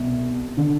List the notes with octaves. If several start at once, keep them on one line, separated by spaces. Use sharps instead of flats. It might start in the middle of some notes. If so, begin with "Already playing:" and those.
Already playing: C2 B2
D3